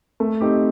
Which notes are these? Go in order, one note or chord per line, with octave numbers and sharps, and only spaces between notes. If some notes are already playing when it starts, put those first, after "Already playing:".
A3
C4 D#4 G4